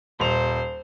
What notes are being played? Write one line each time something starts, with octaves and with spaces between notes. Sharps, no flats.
D#1 C5 F7